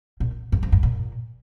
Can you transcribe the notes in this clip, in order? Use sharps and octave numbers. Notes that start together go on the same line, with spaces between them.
A#2
G2
F2
G2
A#2